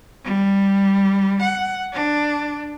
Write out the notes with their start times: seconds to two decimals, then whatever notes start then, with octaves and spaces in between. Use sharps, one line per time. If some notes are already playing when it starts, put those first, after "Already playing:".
0.24 G3
1.42 F#5
1.93 D4